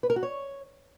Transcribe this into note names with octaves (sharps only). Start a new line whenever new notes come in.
B4
A#4
F#4
C#5